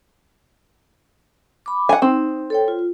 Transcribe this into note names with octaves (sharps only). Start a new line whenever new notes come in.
B5 D6
F#5 G#5
C4 D#4
A4 C#5 G5
F4